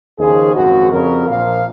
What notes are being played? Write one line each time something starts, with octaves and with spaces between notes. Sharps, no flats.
D#2 C#3 F3 G#4
G#1 F#2 F3 F#4
F2 C#3 F#3 A#4
A#1 A#2 F3 A#3 F5